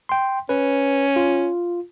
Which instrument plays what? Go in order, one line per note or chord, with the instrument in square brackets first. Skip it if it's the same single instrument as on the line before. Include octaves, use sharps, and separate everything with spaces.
[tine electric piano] G5 C6
[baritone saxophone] C#4 [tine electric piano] B4
[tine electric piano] F4